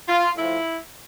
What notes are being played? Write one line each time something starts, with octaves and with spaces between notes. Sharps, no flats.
F4
A2 F3 E4